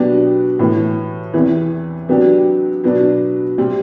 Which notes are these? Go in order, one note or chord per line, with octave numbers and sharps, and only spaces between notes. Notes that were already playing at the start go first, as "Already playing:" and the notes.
Already playing: B2 F#3 B3 D4 G4
A2 E3 B3
E2 C3 E3
C3 F#3 B3 D4 G4
B2 F#3 B3 D4
C3 G3 C4